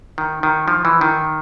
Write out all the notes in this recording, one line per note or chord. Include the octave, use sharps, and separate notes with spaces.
D#3
D#3
F3
E3
D#3